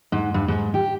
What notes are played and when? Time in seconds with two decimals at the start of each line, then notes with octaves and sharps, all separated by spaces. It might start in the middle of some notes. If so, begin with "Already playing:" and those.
0.12 G#2
0.34 G2
0.48 G#2
0.74 G4